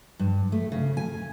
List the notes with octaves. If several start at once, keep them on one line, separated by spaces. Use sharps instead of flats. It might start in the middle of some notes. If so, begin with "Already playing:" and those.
G2
A3
C#3
G#5